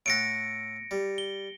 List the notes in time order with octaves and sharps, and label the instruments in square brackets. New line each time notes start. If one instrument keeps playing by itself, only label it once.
[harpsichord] A2 A3 F#5 [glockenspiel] A#6 C#7 D7
[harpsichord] G3
[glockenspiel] G7